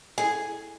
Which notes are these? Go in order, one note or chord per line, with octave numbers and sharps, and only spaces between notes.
G#4